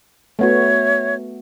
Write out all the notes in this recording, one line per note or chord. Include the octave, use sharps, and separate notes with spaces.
A3 B3 F#4 C#5 E5